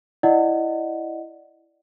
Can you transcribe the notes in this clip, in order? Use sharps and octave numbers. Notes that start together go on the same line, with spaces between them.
E4 D5 D#5 F#5